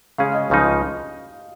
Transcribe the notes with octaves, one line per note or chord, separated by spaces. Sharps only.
C#3 G#3 C#4 G#4 F5
D#5
C#2 C#3 F3 G#3 D#4